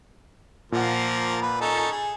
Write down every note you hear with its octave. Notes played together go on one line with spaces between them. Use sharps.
A#2 F3 A#3 F#5
B4
C#4 D#4 A4
G#4